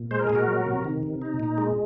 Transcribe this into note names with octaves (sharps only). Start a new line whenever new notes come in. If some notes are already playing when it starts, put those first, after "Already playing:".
Already playing: A#2
G#3 C5
A#4
A#2 G#4
F#4 A#4
F#3
C3
D#3
C3
D#4
A#2
G#3